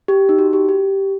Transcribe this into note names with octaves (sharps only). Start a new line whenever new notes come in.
G4
D#4
F#4
G4
G4